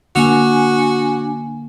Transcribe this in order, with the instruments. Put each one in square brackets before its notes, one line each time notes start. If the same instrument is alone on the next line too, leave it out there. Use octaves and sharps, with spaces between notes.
[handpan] D3 A#3 [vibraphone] D4 G#5 [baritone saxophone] F#4